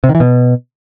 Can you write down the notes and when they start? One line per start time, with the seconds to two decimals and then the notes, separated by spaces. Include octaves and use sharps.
0.04 C3
0.09 D#3
0.15 E3
0.20 B2